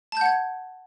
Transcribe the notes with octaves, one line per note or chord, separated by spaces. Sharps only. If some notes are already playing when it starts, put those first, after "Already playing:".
F#5 A5 G6 G#6